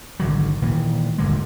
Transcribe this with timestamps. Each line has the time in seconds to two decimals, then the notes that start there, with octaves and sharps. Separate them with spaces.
0.20 G#1 D3 F#3
0.62 A#2 D#3 E3
1.18 D#1 G#2 D3 G#3